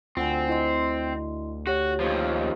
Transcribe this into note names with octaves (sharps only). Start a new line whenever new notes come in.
D2 C4 F4 F#5 G#5
E4 D#5 C6
F#4 G4 C#5
D#2 F3